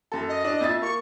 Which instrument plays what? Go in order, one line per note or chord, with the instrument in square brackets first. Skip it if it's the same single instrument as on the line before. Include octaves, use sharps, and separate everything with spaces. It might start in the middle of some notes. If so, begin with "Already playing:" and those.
[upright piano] F#2 A4
[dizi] D#5
[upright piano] D4
F2 E5 A6
[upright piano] A#3 [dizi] C#6